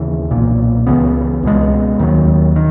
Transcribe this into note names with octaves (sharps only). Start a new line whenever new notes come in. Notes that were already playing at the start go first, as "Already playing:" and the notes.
Already playing: D#2 C#3 E3
B1 A#2 A#3
C#2 C#3 E3 B3
C#2 B2 G#3
D#2 D#3 F#3
D#3